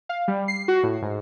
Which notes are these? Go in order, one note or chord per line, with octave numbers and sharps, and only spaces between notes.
F5
G3
C7
F#4
A2
G#2